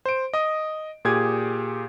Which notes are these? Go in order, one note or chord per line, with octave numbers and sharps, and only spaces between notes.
C5 D7
D#5 D#6
A#2 G4 G#4 D#6 G#6